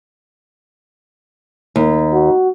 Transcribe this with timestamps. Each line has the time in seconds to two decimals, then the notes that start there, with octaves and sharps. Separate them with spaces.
1.76 D#2
2.13 F#4